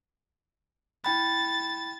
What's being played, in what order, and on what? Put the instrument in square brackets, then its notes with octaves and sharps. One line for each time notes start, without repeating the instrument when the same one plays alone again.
[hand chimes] E4 G5 B5 [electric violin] A6